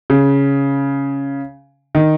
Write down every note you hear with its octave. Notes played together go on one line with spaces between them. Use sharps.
C#3
D#3